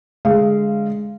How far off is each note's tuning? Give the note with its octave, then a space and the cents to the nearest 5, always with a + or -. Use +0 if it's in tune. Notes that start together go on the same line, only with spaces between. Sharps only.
D3 +0 G#3 +0 F5 -20